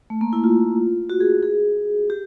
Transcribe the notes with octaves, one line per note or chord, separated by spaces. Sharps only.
A3
A#3
E4
F4
F#4
G#4
G#4
G4